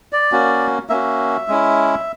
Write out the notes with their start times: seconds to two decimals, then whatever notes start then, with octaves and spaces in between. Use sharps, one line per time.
0.13 D5
0.32 A#3 C#4 F#4
0.89 A#3 C#4 F#4 E5
1.48 G#3 C#4 E4